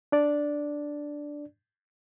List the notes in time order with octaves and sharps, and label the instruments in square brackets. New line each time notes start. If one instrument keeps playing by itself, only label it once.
[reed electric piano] D4 D5